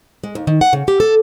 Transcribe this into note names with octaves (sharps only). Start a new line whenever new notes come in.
G#3
D#2
D#3
F#5
C#3
G4
A4